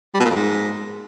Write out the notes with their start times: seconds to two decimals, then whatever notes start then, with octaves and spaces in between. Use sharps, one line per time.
0.15 G3
0.20 B2
0.25 A#2
0.31 F2
0.36 G#2